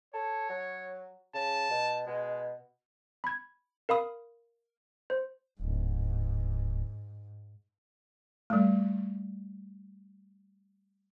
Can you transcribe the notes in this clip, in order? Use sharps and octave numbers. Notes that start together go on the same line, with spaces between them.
A4 C#5
F#3
C#3 A5
B2
B2 G#3
B5 G#6
A#4 F5 B5 D#6
C5
D1 G#2
G3 A3